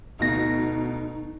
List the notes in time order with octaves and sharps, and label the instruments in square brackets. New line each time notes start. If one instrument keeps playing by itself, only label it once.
[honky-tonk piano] D2 B2 A#6 [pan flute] D#4